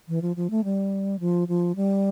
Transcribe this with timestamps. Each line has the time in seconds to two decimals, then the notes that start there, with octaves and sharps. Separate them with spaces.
0.08 E3
0.22 F3
0.36 F3
0.50 A3
0.64 G3
1.20 F3
1.48 F3
1.76 G3